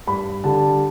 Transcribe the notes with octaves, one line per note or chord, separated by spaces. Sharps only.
G2 B5
D3 G3 A5